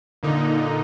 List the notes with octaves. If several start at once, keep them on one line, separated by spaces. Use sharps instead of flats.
A#2 D3 D#4